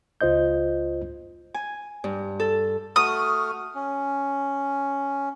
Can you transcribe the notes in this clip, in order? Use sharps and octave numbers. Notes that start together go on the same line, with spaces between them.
C#2 F4 C5 D#5 G6
G#5
G2
A4
A3 F#4 D#6 F6
C#4